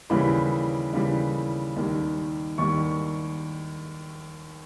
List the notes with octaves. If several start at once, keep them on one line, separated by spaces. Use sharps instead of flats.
D#2 C#3 E3 G3 B5
D#2 C#3 E3 G3
D#2 D#3 G3
D#2 D#3 G3 C#6